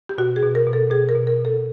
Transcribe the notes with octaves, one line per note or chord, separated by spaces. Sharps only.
G4
B2 F#4
G#4
B2
A#4
B2
A4
B2 G#4
A#4
B2
A#4
B2
A4